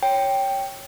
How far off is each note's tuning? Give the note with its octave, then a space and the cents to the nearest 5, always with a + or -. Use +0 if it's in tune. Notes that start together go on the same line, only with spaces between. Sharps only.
C#5 +0 G5 +0